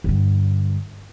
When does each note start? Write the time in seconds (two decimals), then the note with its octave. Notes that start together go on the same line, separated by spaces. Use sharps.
0.04 G2 D3